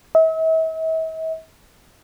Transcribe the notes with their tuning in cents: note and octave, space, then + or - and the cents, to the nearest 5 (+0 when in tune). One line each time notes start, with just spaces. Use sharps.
E5 -45